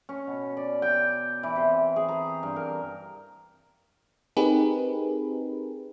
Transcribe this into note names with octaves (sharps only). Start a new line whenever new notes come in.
C#4
B2
D5
G5
E3
C3
G#4
A#5
G2
A#4
C4 D#4 G4 G#4 A#4 B4